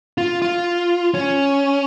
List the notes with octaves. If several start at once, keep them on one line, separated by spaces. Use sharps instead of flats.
F4
F4
C#4